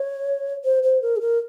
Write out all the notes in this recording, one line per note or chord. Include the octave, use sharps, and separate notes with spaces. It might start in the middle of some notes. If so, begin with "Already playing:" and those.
Already playing: C#5
C5
C5
A#4
G#4
A#4